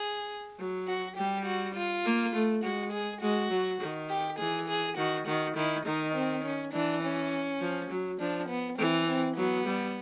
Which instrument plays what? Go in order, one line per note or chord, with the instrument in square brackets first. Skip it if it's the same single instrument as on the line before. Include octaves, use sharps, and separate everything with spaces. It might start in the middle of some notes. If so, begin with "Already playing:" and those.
Already playing: [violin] G#4
[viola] F#3
[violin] F#4
[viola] G3 [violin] G4
[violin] F#4
F4
[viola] A#3
A3
[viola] G#3 [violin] F#4
[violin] G#4
[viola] G#3 [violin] F#4
[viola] F#3
D#3
[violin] G4
[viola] E3 [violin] G#4
[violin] G#4
[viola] D#3 [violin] F#4
[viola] D#3 [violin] F#4
[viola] D#3 [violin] E4
[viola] D#3 [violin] D#4
[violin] C4
C#4
[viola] E3 [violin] D4
[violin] C#4
[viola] F3
F#3
[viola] F3 [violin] D4
[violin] B3
[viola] E3 [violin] C4
[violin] C4
[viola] F#3 [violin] B3
[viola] G3